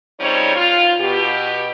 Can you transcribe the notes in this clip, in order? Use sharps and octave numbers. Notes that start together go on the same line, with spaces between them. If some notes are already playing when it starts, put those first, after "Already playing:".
C#3 F3 G3 C4 D#4 C#5
F4
B2 G4